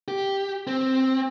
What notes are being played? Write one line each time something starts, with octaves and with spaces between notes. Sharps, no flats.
G4
C4